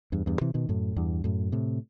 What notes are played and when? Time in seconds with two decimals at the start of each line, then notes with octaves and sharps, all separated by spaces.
0.12 E2 G2
0.26 E2 G2
0.41 C3 E3
0.54 B2 D#3
0.69 F#2 A2
0.96 E2 G2
1.24 F#2 A2
1.52 A2 C3